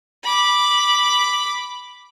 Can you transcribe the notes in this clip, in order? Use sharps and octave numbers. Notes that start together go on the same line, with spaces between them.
B5 D6